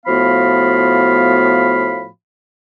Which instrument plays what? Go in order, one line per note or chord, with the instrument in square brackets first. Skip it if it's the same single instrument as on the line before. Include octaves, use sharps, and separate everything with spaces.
[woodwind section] A2 F3 B3 F#4 F5 B5